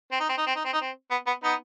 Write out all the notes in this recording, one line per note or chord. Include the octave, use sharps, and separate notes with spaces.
C4
D#4
C4
D#4
C4
D#4
C4
D#4
C4
B3
B3
B3 D#4